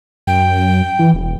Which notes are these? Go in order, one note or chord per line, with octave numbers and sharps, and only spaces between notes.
F#2 G5
E3
E1